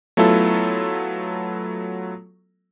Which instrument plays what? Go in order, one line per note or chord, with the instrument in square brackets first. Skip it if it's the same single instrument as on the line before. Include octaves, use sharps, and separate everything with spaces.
[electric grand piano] F#3 A3 B3 E4 F4 A4